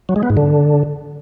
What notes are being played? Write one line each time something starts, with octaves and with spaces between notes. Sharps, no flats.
F#3
G#3
B3
G#2
D3